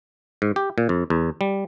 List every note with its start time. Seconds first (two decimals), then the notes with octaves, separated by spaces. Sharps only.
0.42 G#2
0.56 G4
0.78 A#2
0.89 F2
1.10 E2
1.41 G3